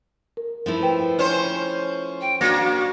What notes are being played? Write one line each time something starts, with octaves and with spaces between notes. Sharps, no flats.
A#4
F3 A3 E4
B4 G5
C#4 C5
G5
A#3 D4 F#4 A#6